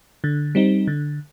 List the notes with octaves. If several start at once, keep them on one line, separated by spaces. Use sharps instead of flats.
D3
G3 C4 D#4
D3